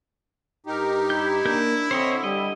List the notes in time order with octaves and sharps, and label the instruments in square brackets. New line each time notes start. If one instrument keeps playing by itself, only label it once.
[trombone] G2 [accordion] D#4 G4 [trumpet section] A#4
[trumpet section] E4 [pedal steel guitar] G6
[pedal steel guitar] A#3 A#4 G6 [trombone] D4
[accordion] D3 [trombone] C4 [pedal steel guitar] C5 C#5 D#5
[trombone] G3 [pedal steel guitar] D#5